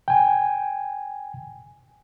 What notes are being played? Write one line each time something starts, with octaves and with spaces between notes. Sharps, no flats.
G5 G#5